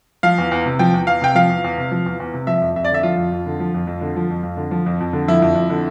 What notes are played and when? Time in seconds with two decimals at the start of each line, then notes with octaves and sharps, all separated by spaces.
0.23 F3 F5
0.38 E2
0.51 E2
0.66 C3
0.79 F3 G5
0.94 E2
1.07 E2 F5
1.21 C3 G5
1.35 F3 F5
1.50 E2
1.64 E2
1.78 C3
1.91 F3
2.06 E2
2.20 E2
2.34 C3
2.47 F3 E5
2.62 F2
2.76 F2 E5
2.84 D5
2.90 D3 E5
3.03 F3 F4
3.17 F2
3.32 F2
3.46 D3
3.60 F3
3.74 F2
3.87 F2
4.01 D3
4.16 F3
4.30 F2
4.43 F2
4.57 D3
4.71 F3
4.86 F2
5.00 F2
5.13 D3
5.28 F3 E4
5.42 F2
5.55 F2
5.70 D3